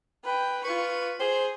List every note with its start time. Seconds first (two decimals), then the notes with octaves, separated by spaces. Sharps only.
0.24 B4 G5
0.65 F4 B4 C#6
1.20 G#4 C5